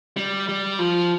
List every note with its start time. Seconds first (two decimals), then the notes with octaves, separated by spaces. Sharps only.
0.17 G3
0.49 G3
0.79 F3